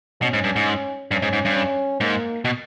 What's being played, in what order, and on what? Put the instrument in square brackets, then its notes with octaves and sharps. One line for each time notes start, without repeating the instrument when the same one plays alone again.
[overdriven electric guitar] B2 [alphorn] C#4
[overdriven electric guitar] G#2
G2
G#2
[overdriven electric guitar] G2 [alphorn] C#4
[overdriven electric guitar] G#2
G#2
G2
[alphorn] C#4
[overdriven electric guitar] G#2 [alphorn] A#3
[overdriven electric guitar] B2